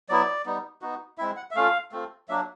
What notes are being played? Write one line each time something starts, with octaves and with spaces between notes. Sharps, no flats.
F#3 B3 E4 D5
G3 B3 D#4
B3 D#4 F#4
G#3 C4 E4 E5
F#5
E5
A3 C#4 F4 F5
A3 C4 F4
F#3 A#3 D4 E5